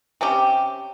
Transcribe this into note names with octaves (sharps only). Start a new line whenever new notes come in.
C3 C4 C#4 G4